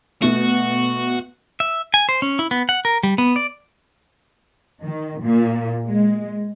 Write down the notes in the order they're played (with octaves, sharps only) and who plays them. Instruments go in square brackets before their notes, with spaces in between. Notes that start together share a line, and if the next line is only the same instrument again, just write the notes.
[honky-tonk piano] B2 A3 [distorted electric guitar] F#4
[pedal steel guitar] E5
G#5
C5
C#4
E4
B3
F#5
A#4
G3
B3
D5
[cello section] D#3
A#2
G#3